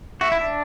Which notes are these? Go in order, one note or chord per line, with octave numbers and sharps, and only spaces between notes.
F#4 E5
E4
D4